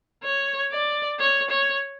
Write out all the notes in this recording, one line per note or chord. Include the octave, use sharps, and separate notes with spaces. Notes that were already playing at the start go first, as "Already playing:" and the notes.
C#5
D5
C#5
C#5